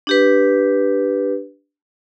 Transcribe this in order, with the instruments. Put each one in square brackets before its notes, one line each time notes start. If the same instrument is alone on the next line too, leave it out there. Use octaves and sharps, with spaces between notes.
[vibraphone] D4 G4 B4